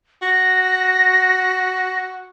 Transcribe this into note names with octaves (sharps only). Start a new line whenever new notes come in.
F#4 A#6